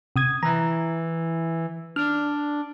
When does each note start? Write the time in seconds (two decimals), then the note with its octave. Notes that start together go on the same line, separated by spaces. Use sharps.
0.16 C3 D#6 G#6
0.43 E3 A#5
1.96 D4 F6